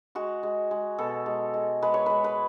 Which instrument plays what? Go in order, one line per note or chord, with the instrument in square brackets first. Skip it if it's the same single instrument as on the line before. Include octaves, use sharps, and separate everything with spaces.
[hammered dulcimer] G#3 F#4
G#3
G#3
B2 A4
G#3
G#3
G#3 B4
C#5
G#3 B4
B4